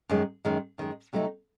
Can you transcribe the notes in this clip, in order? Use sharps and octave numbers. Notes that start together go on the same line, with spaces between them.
F#2 D#3 G#3
F#2 D#3 G#3
F#2 D#3 G#3
C3 F#3 A3 D#4